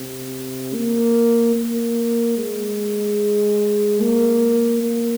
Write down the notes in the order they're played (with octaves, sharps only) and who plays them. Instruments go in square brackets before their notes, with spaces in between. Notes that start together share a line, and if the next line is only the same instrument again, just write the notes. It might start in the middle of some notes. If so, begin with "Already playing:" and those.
Already playing: [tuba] C3
A#3
A#3
G#3
A#3
A#3